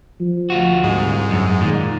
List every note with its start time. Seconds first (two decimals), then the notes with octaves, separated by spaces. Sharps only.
0.20 F3
0.50 D2 F4 F#4
0.84 C2 G#2
1.31 F#2
1.61 A#2 D#3